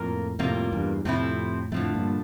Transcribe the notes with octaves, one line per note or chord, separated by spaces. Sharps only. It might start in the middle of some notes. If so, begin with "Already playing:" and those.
Already playing: F2 A2 A#3 F4 A#4
F2 A2 C3 G3 A#3 F4
E2 G2
F2 A2 C3 F3 A3 C4 E4
F2 A2 D3 F3 A3
G2 A#2